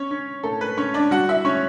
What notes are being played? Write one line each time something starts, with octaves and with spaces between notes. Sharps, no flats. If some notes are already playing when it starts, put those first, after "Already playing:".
Already playing: C#4 C#5
C#4
A2 A4
B4
C#4 C#5
D4 D5
G3 F#4 F#5
E4 E5
A2 C#4 C#5